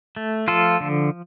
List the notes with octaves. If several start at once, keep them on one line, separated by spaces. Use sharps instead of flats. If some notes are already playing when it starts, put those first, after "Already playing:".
A3
F3 F4 A4
D3